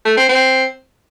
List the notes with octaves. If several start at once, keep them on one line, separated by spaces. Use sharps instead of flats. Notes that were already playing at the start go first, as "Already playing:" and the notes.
A3
C4
C4